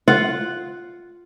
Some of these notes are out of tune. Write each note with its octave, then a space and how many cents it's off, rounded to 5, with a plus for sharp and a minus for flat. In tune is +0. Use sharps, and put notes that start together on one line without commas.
F4 +0 F#5 +0